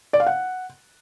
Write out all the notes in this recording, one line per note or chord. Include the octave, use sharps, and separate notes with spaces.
D5
F5
F#5